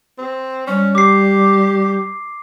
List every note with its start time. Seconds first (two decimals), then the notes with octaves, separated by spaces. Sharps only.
0.18 C4
0.67 G3 C#4
0.95 G4 D6 C7